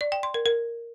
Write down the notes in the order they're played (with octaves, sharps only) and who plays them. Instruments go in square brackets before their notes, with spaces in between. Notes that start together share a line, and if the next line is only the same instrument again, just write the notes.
[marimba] D5
G5
C6
A#4
A#4